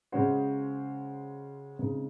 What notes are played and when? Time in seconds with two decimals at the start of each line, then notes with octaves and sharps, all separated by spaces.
0.12 C#3 G#3 C#4 F#4 C5
1.79 C#3 G#3 C4 D#4